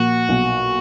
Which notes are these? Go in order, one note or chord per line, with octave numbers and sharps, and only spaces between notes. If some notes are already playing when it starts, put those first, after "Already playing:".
Already playing: A#2 F3 F#4
B1